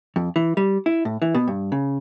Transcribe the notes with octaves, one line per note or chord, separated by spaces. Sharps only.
F2
E3
G3
E4
A2
E3
B2
G2
C#3